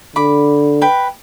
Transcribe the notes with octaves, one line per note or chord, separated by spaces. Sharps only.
D3 B5 D6
B4 G5 B5